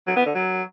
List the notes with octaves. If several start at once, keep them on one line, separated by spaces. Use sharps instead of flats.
F#3
B3
D3
F#3